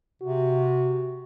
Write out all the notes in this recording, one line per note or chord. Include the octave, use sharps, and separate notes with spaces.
C3 F#4